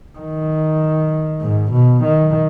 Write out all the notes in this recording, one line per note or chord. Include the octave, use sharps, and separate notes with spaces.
D#3
G#2
B2
D#3